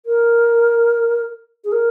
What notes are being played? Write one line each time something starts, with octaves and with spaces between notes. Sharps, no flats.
A#4
G#4
A#4